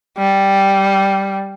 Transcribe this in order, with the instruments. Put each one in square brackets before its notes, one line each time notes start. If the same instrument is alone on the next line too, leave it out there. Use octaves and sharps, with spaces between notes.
[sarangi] G3